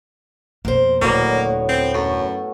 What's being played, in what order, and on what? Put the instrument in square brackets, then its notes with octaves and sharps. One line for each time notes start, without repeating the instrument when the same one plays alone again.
[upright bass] F2 B2 [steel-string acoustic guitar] A#3 C5
[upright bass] D#1 [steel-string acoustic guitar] D2 F#3 C#5 [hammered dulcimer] A2 B3 F#4 [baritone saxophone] A#3
[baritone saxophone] C4
[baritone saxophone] F#2 [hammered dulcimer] A3 F#4